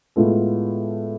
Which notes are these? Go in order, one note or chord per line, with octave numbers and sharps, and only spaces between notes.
A2 G#3 B3 F4 A4